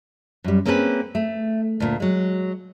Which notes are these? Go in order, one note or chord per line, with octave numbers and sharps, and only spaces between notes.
F#2 G3
A#3 C4 C#4 G#4 A4 B4
A3
D2 A#2
F#3 G#3